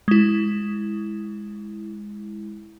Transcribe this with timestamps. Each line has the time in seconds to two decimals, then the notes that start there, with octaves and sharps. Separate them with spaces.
0.08 G#3 E4